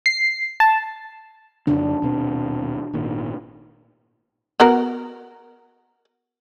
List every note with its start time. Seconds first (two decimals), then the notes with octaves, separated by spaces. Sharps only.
0.06 C7
0.60 A5
1.67 F2 C#3 D4
2.02 D#1 B2 C4
2.93 G#1 A#2 D#3
4.60 B3 F#4 A#4